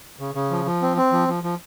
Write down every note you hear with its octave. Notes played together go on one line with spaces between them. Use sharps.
C#3
C#3
F3
F3
C4
C4
F3
F3
F3